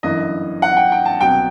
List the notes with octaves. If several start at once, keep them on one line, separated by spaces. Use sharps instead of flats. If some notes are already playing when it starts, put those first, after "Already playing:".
G1 F#2 E3 D#5
F#5
G5
G5
A5
C2 B2 F#3 B3 G5